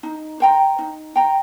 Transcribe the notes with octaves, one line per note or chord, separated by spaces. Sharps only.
D#4
C5 G5 A#5
D#4
C5 G5 A#5